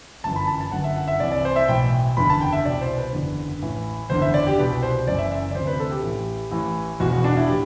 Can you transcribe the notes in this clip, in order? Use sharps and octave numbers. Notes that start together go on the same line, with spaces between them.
G1 F#2 E3 A5
B5
A5
A5
G1 F#2 D3 F#5
E5
F#5
E5
C2 C3 E3 D5
D5
C5
E5
B1 A2 E3 G5
F#1 E2 D3 B5
A5
G5
E5
C2 B2 D5
C5
B4
F#1 E2 D3
A1 A2 E3
F#1 E2 D3 C5
E5
D5
G4
C2 B2 B4
C5
F#1 F#2 E3 D5
E5
E5
D5
D2 C3 E3 C5
B4
A4
G4
A1 A2 E3
A1 A2 E3
E1 E2 B2 F#4
F#4
D4
E4
A2 E3 G4